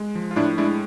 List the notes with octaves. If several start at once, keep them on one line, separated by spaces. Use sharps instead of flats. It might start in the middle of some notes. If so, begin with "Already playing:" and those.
Already playing: G#3
F3
F4
A2 D4 E4
G#3 D4 E4